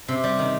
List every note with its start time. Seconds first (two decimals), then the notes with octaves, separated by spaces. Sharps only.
0.08 C3
0.24 G3
0.39 D#3